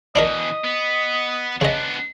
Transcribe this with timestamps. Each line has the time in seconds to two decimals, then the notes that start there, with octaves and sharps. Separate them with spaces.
0.16 B2 E3 D4 D#4 A#4 D#5
0.64 B3
1.61 C#3 B3 D4 D#5